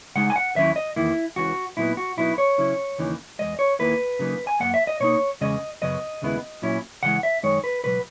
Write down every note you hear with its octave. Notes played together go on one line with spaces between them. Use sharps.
C#3 G#3 D#4 F#5
G#5
F#5
D#2 D#3 F#3 C#4 E4 E5
D#5
E2 D#3 A#3 E4
C#2 C#3 E3 F#4
A#2 F#3 B3 D#4 E4
F#4
B2 F#3 B3 D#4 E4
C#5
C#3 F#3 C#4 E4
D#2 C#3 E3 A#3 D#4
E2 D#3 G#3 D#5
C#5
D#2 D#3 A#3 E4 B4
C#3 F#3 A#3 D#4
G#5
F#2 E3 A#3 F#5
E5
D#5
B2 A#3 D#4 C#5
E2 C#3 G#3 C#4 D#5
F#2 C#3 F#3 B3 D#5
D#2 C#3 G#3 B3 E4
A#2 F#3 C#4 E4
C#3 E3 G#3 F#5
E5
F#2 D#3 G#3 D#4 C#5
B4
C#2 B2 F#3 B4